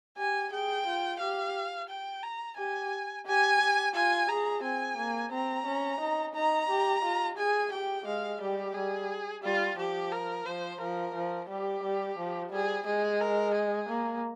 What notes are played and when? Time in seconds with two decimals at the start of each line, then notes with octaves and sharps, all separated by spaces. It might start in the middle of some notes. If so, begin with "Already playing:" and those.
0.18 G4 G#5
0.51 G#4 G5
0.87 F4
1.20 G4 F5
1.89 G5
2.23 A#5
2.58 G4 G#5
3.26 G4 G#5
3.61 G4
3.94 F4 G#5
4.29 G#4 A#5
4.63 C4 G#5
4.97 A#3
5.32 C4 A#5
5.66 C#4
6.00 D#4
6.35 D#4 A#5
6.69 G4
7.04 F4
7.38 G#4 G#5
7.72 G4 G5
8.06 G#3 F5
8.41 G3 G4
8.74 G3 G#4
9.43 G3 F4
9.78 F3 G4
10.12 A#4
10.46 F3 C5
10.80 F3 A#4
11.14 F3
11.49 G3 G4
11.83 G3
12.18 F3
12.52 G3 G#4
12.86 G#3 G#4
13.21 A#4
13.55 G#4
13.89 A#3